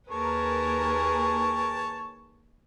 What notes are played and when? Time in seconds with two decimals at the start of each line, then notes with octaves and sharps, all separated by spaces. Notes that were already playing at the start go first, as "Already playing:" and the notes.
0.11 D#2 G#4 A#4 B4 C#5 A5